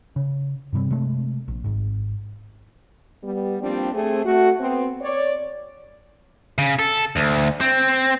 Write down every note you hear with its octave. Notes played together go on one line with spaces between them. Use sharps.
C#3
G2 C3 G3 C4
C3 G#3 A3
A#1
G#1 G#2
G3 B3
F3 G3 A#3 C4 D4 G4
A3 C4 G#4
A3 F#4
B3 C4
C#5 D5
C#3
A4
D2
C4